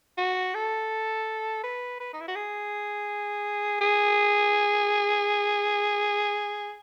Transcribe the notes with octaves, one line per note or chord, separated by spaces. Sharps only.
F#4
A4
B4
B4
D#4
E4
F#4
G#4
G#4